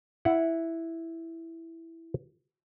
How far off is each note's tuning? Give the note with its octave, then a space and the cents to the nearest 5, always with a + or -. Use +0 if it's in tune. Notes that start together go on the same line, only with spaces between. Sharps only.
E4 +0 F#5 +0